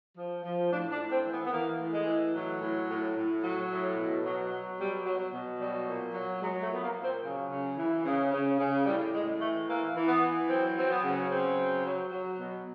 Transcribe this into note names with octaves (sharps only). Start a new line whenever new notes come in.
F3
F3
A2 D4
D4
A2
C4
E3
B3
B3
E3 A#3
A2
G#3
E3
A2 F#3
A2
A2
A2
F#3
A2
B2
F#3
F#3
B2 G3
F#3
F#3
B2
F#3 G3
A#2
F#3
F#3 G#3
A3
A#2
B3
A#3
A#2
C4
C#3 F#3
C#3
E3
C#3
C#3
C#3
A2 G3
A2 G#3
E3 A3
E3 A#3
E3
B3
E3
F#3 C4
F#3 C4
B3
C#3
C#3 C4
F#3
F#3
F#3
B2